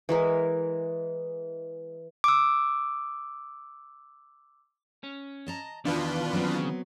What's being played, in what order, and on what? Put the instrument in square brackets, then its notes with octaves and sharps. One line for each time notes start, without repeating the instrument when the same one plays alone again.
[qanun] E3 G#3 A#4
[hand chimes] D6 E6
[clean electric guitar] C#4
[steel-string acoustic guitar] D#5 A5 A#5
[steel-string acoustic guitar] E2 [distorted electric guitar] B2 [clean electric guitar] D#3 E3 [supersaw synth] D4 F4 B4
[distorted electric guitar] C#3 [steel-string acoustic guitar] F#3 B3 C4